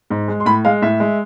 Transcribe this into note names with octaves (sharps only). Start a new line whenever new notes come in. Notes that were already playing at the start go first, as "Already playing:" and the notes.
G#2
G#3
C6
A2 B5
G#3 F5
A2 E5
G#3